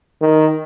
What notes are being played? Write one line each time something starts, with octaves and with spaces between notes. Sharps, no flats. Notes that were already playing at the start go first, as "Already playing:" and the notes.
D#3